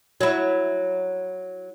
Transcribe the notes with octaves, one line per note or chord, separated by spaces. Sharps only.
F#3 E4